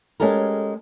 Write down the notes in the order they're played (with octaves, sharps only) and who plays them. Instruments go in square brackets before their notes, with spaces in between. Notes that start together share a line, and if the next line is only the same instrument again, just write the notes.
[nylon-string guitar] G#3 C#4 G4 A4 A#4